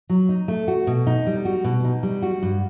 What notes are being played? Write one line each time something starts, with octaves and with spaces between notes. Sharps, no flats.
F#3
D#4
A3
F#4
B2
D#4
G3
F#4
B2
D#4
G3
F#4
G2